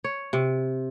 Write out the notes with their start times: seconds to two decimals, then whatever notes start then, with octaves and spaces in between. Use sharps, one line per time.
0.04 C#5
0.33 C3